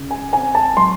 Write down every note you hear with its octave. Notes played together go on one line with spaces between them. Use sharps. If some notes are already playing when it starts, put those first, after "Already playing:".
Already playing: C#3
G#5
C4 G#5
A5
F#3 C6